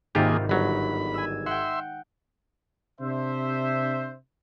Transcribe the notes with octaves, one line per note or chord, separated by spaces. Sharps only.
G#1 G#2 C3 D#3 A#3 F4 G4 G#4
G1 F#3 B5
G#5 E6
E5 F#5 G5 C6
C3 D4 C5 E5